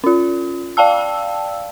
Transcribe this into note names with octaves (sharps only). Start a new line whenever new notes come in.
C#4 F4
D5 F5 G5 A5 E6